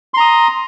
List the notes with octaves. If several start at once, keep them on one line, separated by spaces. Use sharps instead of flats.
A#5 C6 D#6